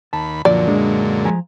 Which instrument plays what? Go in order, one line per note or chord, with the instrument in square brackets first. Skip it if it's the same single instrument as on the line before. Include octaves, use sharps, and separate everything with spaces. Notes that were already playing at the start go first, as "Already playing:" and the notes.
[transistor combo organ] D#2 B5 [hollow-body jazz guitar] A5
[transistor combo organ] F#2 A#2 D3 [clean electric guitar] F3 [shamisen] D5
[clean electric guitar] G#3 [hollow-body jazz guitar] D4
[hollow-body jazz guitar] F3 G#5 A#5